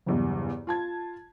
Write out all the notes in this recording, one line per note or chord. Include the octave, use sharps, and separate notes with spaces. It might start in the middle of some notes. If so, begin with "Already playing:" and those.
F#1 E2 G2
F4 A5 G#6